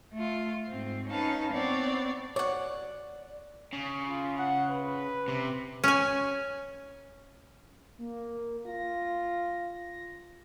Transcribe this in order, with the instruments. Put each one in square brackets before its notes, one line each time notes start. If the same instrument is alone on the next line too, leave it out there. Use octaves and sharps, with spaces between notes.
[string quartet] A3 F4
G#2 C4
C#4 D#4 B4 F5 A5
B3 C4 C#5 D5
[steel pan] C#5 [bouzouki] D5 F#5
[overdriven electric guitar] C#3
[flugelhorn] F4
F#5
B4
[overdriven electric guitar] C3
[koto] C#4 G#5
[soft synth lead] A#3
[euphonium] F4 [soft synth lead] A#6